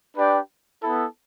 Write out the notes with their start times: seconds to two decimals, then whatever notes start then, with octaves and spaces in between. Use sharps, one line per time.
0.15 D4 G4 B4 D5 G5
0.82 B3 E4 A4